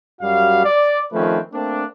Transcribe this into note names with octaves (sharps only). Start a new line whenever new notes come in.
F#2 G3 F#4 F5
D5
D#3 F3 A3 C4 C#4 B4
A3 A#3 C4 D4